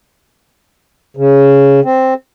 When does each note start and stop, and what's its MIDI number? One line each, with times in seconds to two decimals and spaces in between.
1.17 1.80 49
1.84 2.14 60